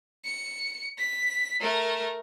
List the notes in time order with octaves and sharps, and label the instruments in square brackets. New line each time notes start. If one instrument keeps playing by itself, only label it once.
[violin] C#7
B6
A3 A#4